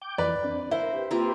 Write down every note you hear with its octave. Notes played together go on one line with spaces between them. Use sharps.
G5 D6 G6
F2 E3 B4 D5
C4 D4
E4 A#4 C5
G4 B4
A#3 C4 F4